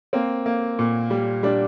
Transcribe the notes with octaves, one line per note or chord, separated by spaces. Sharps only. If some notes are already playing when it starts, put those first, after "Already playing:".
A#3 C4
A#3
A#2
G3
G3 D4